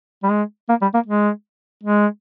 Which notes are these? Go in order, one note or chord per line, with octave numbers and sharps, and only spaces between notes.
G3
G#3
A#3
G3
A#3
G#3
G#3